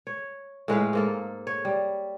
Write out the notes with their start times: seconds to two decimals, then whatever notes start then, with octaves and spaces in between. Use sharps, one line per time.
0.07 C#5
0.68 A2 G#3 B4 F5
0.93 G#2 A#3 A4
1.47 C#5
1.65 G3